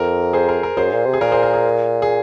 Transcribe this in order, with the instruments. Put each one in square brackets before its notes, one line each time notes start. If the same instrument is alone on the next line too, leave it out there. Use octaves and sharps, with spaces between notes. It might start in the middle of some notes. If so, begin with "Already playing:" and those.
Already playing: [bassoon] F2 [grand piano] A#4
[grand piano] G#4 C5
A#4
A#4
[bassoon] F#2 [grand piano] G#4 C5
[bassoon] A#2
C3
[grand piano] G#4
[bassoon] A#2 [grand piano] A#4
[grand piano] G#4 C5
A#4
G#4
G#4